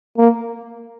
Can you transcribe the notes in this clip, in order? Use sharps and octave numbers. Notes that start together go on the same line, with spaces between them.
A#3